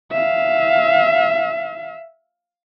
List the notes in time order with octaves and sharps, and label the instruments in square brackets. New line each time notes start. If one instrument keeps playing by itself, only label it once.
[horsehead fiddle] E5 F5